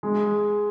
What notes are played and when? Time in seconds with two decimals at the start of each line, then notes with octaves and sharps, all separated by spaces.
0.03 G#3